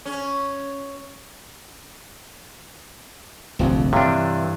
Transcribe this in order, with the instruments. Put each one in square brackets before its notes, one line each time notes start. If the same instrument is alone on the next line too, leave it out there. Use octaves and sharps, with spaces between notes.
[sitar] C#4
[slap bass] D1 A#1 F2 [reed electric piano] C3 C4 F4
[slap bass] G2 E3 [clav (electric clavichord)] C3 D4 [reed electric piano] C#5 F5